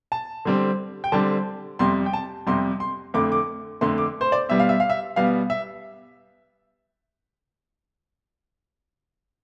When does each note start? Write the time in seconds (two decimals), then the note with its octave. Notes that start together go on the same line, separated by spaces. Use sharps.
0.12 A5
0.45 D3 G3 C4
1.04 G5
1.12 D3 G3 C4 A5
1.79 F2 C3 G3 C6
2.06 G5
2.13 A5
2.47 F2 C3 G3 C6
2.80 C6
3.14 F2 D3 A3 D6
3.32 D6
3.81 F2 D3 A3 C6
3.98 D6
4.21 C5
4.32 D5
4.49 B2 G3 B3 E5
4.60 F5
4.69 E5
4.80 F5
4.90 E5
5.16 B2 G3 B3 F5
5.50 E5